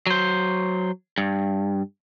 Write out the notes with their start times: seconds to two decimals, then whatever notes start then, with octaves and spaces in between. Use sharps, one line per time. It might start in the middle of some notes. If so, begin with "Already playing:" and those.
0.07 F#3 C5
1.18 G2